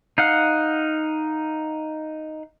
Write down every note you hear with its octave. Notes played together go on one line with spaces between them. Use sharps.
D#4 F5 F#5